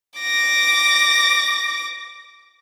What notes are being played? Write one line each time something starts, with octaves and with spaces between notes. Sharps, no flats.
D6 A#6